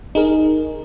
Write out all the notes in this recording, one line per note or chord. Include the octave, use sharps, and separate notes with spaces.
D#4 G#4 A#4